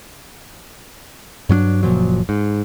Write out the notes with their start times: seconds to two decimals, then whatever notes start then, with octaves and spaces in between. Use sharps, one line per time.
1.49 G2 F#3 C#4 D4
1.83 F#1 A#2 F3 F#3
2.29 G#2